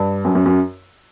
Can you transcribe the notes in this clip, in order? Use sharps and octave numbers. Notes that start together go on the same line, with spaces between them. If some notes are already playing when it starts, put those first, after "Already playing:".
Already playing: G2
F#2
F#2
F#2